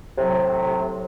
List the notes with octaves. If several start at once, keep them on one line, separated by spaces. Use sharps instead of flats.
A2 C3 F#3